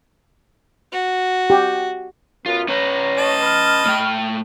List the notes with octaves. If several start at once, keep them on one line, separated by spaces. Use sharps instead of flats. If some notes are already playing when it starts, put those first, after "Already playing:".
F#4
G4
F#2 B3 F4
C#4 B4 C#5 A#5
D#5 A5
B5 F6
A2 A3 G5